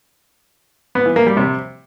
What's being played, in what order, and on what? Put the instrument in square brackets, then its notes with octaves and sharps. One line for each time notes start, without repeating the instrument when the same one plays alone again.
[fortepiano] B3
E3
A#3
G3
C3